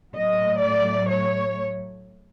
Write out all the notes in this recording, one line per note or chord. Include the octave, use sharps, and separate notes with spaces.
A2 F#3 A3 D#5
D5
C#5